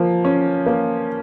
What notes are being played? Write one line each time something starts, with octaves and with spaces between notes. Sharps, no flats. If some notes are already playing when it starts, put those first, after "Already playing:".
Already playing: F3 A#3
C#4
A#3